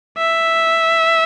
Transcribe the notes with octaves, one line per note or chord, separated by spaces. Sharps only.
E5